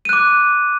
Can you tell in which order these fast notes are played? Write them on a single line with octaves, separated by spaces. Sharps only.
D#7 F#6 D6